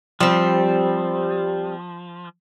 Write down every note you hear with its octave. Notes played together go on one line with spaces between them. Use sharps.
F3 G3 C4